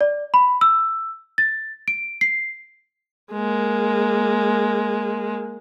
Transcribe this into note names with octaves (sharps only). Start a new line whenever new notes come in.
D5
B5
E6
A6
D7
C7
G#3 A#3